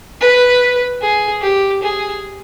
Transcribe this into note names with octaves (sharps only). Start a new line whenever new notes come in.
B4
G#4
G4
G#4